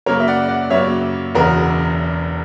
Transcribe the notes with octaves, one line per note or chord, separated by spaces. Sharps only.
F#2 C#3 F#3 A#3 A#4 C#5
E5
D5 F#5
D5 F#5
F#2 C#3 F#3 A#3 C#5 E5
E1 E2 C#3 F#4 A#4